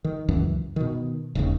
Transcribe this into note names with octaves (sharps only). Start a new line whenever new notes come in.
D#3
C#2 F#2 E3
B2 D#3
E1 D#2 C#3